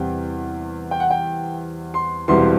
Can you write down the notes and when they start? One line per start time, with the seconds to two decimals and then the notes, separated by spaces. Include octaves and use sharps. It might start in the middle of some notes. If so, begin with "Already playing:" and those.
Already playing: E2 C3 G3 G5
0.91 G5
1.00 F#5
1.11 G5
1.94 C6
2.28 E1 E2 C3 E3 G3 C6